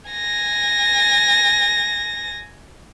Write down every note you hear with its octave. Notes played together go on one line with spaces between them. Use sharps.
G#5 A#6